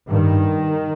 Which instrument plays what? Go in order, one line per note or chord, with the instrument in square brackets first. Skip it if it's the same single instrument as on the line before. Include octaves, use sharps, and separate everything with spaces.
[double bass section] G2 D#3